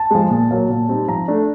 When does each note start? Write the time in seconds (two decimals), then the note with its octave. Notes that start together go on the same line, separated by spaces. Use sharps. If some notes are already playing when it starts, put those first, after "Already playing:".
Already playing: A5
0.11 F3 G#3
0.30 A#2
0.51 F#3 A#3
0.69 A#2
0.89 G3 C4 D#4
1.08 F3 A#5
1.28 A3 D4